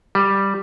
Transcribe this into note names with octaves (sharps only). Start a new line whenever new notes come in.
G3